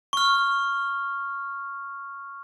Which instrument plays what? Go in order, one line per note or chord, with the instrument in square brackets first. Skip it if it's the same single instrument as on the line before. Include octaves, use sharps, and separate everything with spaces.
[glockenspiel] C#6 F6